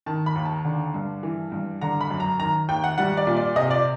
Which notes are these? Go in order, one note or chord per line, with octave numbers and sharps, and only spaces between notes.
D#3 A5
B5
D#2
A5
D3
G2
E3
G2
D3 A#5
B5
F#2
A#5
D#3 A#5
D#2 G5
F#5
G3 F#5
D5
A#2
D5
C3 D#5
D5